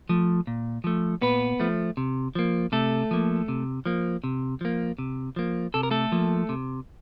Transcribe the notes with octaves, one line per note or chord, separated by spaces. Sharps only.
F3 A3
A#2
F3 A3
A#2 B3 B4
F3 A3
C3
F3 A#3
C3 A3 A4
F3 A#3
C3
F3 A#3
C3
F3 A#3
C3
F3 A#3
C3 A4
A#4
A3 A4
F3 A#3
C3